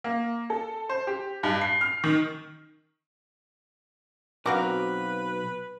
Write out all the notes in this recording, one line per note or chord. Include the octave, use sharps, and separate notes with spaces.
A#3
A4
C5
G4
G2
C7
F6
D#3
B1 C4 F#4 A#4 B4 F5 D6